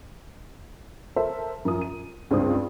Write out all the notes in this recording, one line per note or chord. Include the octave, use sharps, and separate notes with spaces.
A4 A#4 C5 E5
F#2 F3 D#6
D#7
C#2 G2 C4 D#6